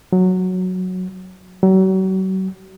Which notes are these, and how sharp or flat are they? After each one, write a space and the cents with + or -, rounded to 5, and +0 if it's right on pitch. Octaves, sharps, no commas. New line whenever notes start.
F#3 -5
F#3 +40